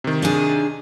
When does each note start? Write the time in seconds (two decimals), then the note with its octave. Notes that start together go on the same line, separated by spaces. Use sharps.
0.04 C3 D#3
0.22 D4 D#4 G#4